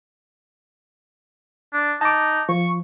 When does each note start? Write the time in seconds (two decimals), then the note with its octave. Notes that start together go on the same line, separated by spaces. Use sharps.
1.73 D4
2.01 D#4 A5 D6
2.49 F3 C#6